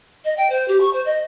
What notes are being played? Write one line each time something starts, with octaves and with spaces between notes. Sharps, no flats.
D#5
G5
C5
G4
C#6
C5
D#5